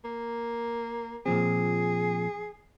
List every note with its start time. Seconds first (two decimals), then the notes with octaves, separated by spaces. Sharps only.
0.05 A#3
1.26 A#2 F3 C4 G#4